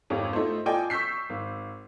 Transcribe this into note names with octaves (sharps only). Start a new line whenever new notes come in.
G#1 F2 G4 C#5
A3 D#4 F4 C5
F4 A4 D5 D#5 G5 G#5
C#6 E6 G6 B6 C7
G#1